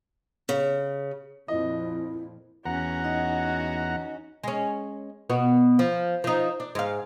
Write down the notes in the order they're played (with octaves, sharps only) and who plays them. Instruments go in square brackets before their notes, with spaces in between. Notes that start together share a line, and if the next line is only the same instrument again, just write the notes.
[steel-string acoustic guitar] C#3
[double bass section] F2 A#2 [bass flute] E4 [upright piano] D#5
[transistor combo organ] E2 F#5 A#5 [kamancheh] C#4 F#4
[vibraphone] D#4 D#5
[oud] G#3 C#4
B2 B3 F#4
F3
F3 D#4
D4
G#2 F5